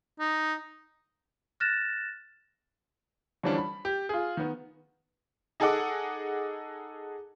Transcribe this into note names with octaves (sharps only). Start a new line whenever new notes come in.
D#4
F6 F#6 A6 A#6 E7
D3 E3 F3 G3 C#4 D4
B5
G4
F4 G#4
D#3 B3
D#4 G#4 A4 D#5 F#5 D6